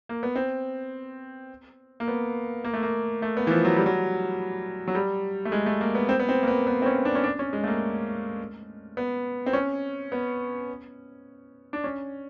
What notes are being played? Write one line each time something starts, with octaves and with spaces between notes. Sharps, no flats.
A#3
B3
C4
A#3
B3
A#3
A3
A#3
A3
B3
E3
F3
F#3
G3
F#3
F#3
G3
A3
G#3
A3
A#3
B3
C4
B3
C4
A#3
B3
B3
C4
C#4
D4
C#4
D4
C#4
G#3
A3
A#3
B3
C4
C#4
B3
D4
C#4